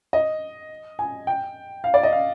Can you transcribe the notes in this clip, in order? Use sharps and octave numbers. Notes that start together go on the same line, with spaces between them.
D#5
G#5
G5
F5
D5
D#5
F5